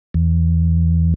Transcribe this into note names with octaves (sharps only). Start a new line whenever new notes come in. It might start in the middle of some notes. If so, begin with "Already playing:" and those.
E2